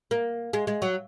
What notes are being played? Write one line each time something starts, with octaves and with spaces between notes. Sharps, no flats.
A#3
G#3
G#3
F#3